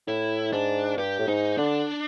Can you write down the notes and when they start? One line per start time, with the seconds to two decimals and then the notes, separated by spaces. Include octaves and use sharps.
0.07 A2 E4
0.53 G#2 D4
0.98 G2 G4
1.19 A2
1.28 G#2 D#4
1.58 D3 D4